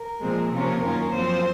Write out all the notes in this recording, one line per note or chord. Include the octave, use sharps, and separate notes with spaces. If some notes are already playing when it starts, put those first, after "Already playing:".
Already playing: A#4
A#2 F3 G#3 C4
C3 F3 A#3 C#4 F4 A#4
F#2 D#3 A#3 C#4 F4
F#2 F3 C4 F4 C5